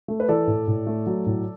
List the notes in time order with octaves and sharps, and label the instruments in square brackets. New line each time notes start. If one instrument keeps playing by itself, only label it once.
[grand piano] A3
B4
E3 A4 D5
A2
A2
A3
F#3
A2